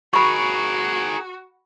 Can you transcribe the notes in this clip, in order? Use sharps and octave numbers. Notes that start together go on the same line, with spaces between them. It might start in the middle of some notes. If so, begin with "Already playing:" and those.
F#4 G#4 A#4 B5 C#6